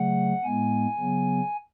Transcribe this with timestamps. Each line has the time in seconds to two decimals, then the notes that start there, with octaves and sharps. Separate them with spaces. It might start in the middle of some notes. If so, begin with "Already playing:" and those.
Already playing: C#3 F#3 A3 F#5
0.44 A2 G#3 B3 G#5
0.99 C#3 F#3 B3